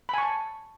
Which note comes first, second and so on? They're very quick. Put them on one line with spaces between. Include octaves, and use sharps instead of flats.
B5 G#5 C#6 A5